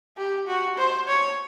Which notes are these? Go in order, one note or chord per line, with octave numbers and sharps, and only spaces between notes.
G4
F#4
C5
C#5